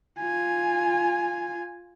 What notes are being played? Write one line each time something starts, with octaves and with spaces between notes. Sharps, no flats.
F4 G#5